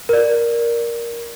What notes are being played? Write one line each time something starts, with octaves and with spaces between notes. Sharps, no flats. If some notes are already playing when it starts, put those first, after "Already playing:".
A#4 D5